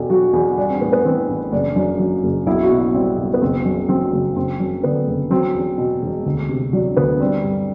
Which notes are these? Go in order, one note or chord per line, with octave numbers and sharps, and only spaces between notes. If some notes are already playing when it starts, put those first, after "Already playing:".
Already playing: E2 B2 G4 A4
F#3 F#4
E2
G3 D4
C4
A2 B3
B3
E3 C4
A1
F#1 D4
F#2 D4
F#3
F#1
B1 E4
F#4
B2
E4
G3 C4
B1
B3
F#1 C4
F#2
F#3 C4
F#1
F#1 C4
F#2
D3 B3
F#1
F#3 C4
E2
B2
E1
D2
C3
F#3 D4
D2 B3
G3 C4
G2